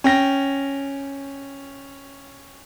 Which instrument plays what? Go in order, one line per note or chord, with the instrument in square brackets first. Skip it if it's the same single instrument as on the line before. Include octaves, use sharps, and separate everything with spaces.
[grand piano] C#4 G5 A#6